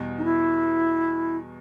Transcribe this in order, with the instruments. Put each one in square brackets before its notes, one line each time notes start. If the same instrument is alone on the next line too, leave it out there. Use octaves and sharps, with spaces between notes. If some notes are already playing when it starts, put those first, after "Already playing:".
Already playing: [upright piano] E2 B2 G3
[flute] D#4
E4